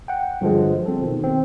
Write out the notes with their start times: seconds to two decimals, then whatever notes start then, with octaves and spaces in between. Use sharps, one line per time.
0.08 F#5 G5
0.41 G2 D3 F3 F#3 G#3
0.86 C4 A4
1.02 B2 D#3
1.24 C4